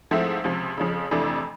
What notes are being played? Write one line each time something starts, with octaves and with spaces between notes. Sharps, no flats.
G#2 F3 A3 C4 E4
C#2 C3 F3
F2 C#3 F3
F2 C3 E3 A3 D4